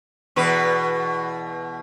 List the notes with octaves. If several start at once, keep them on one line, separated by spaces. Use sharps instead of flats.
E2 B2 B4